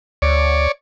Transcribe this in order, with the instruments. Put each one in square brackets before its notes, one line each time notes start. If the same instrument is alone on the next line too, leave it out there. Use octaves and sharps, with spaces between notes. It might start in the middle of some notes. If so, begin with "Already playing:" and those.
[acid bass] D2 [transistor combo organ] C#5 D5